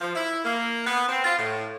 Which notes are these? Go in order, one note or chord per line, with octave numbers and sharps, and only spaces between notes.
F3
E4
A#3
B3
C4
F4
A2